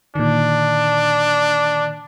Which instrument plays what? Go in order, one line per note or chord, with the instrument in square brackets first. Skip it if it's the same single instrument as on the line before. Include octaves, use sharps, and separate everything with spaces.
[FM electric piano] A#2 D3 D#3 [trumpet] D4